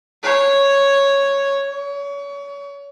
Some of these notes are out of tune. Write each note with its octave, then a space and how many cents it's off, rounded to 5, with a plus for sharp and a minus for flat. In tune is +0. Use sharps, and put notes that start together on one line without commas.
C#5 -5
C#5 +35